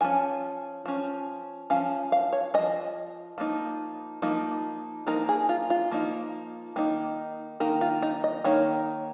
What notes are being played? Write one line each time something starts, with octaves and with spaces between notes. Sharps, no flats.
F3 C#4 G#5
F3 C#4
F3 C#4 F5
F5
C#5
F3 C#4 D#5
F3 A#3 D#4
F3 A#3 D#4
F3 A#3 D#4 A#4
G#4
F4
F4
F3 A#3 D#4
D#3 A#3 D#4
D#3 A#3 D#4 A#4
F4
D#4
D#5
D#3 A#3 D#4 C#5